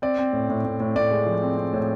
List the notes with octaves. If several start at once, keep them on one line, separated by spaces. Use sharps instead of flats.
C4 D5
C4
A2
A2
A2
A2
A2 D5
G#3
F3
C4
C4
A2